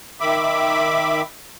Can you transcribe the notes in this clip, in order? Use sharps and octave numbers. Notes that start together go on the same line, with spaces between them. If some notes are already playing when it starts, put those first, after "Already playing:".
D#3 E5 B5 D6